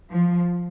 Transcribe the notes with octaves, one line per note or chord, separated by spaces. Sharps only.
F3